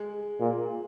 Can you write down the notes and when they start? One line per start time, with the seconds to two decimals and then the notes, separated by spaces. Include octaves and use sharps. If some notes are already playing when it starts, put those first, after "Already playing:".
Already playing: G#3
0.40 A#2